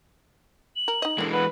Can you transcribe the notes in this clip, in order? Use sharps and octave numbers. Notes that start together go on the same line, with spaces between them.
F#7
A#4
D#4 D#5
D3 E3 G#3 A#3
B4 F#5